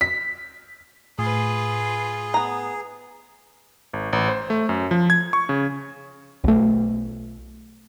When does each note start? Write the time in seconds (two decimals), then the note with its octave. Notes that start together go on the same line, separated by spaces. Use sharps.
0.01 B6
1.18 A2 F4 G#4 B4
2.34 B3 A#5
3.93 G#1
4.13 A1
4.28 C5
4.50 A3
4.69 F#2
4.91 F3
5.10 G#6
5.33 C#6
5.49 C#3
6.44 B1 A3